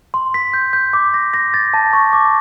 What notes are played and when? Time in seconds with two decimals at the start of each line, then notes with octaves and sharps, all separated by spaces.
0.14 C6
0.34 B6
0.54 G6
0.73 G6
0.93 D6
1.14 A#6
1.34 A#6
1.54 A6
1.74 A5
1.93 C#6
2.13 D6